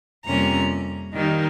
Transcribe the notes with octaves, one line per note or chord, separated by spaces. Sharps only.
F2 C3 G3 A#3 C#4 A#5
D#3 G3 A#3 D#4